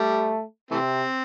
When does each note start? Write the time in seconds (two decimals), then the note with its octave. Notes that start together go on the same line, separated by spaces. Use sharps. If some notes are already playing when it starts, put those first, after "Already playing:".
Already playing: G3 A3
0.71 C3 E3 A3 C4